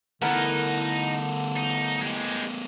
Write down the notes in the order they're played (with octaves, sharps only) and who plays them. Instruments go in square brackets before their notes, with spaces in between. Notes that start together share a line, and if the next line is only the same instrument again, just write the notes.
[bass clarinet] D3 [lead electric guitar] A3 B3 [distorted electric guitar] C#4 A4 [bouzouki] E4 A#4 F#5
[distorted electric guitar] D#4
D#4
G#3 G4